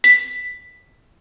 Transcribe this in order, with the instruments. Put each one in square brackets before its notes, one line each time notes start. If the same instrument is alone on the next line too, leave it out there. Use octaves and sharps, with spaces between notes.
[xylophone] B6